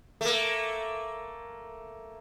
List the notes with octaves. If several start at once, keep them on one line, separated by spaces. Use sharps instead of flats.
A3 A#3